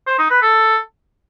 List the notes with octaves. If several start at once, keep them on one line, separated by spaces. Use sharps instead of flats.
C5
D#4
B4
A4